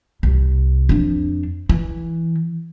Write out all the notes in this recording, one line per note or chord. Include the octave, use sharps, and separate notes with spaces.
C2
F2 D4
E3